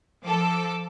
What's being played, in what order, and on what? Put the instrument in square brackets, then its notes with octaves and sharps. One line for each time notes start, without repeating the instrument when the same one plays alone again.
[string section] F3 A4 D6